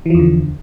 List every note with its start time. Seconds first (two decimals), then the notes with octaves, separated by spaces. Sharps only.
0.06 E3
0.10 F3
0.15 E2
0.19 D3